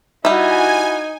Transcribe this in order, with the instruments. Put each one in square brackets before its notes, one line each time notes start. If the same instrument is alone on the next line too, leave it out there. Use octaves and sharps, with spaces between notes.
[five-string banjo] G3 E5 [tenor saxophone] D#4 [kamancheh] E4 F#4 [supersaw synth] G#5